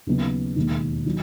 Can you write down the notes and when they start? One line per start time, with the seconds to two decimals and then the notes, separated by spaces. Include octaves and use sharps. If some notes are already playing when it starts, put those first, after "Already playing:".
0.07 D#2 C#3 F#3 B3 D#4
0.56 E1 D#2 D#3
1.06 D#3 F#3